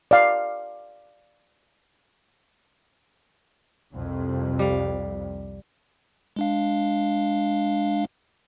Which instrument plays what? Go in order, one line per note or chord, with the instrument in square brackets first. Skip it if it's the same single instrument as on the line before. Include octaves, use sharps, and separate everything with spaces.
[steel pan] D5 F5
[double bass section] C2 F2 C3
[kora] G3 F5
[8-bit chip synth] G#3 D4 F5